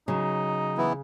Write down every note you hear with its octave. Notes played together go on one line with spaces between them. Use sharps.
C#3 F#3 D#4
E3 B3 E4